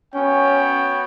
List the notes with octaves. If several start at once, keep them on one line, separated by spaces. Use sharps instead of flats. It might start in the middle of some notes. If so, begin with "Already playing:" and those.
B3 C#4 F#4 C#5 G5